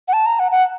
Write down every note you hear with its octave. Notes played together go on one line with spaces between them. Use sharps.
F#5
A5
A#5
F#5
F#5